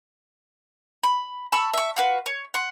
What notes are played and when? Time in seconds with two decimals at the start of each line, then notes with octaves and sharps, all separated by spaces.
1.03 B5
1.52 A5 B5 C#6 E6
1.73 E5 C#6
1.96 F4 F#4 B4
2.26 C#5
2.54 F#5 C6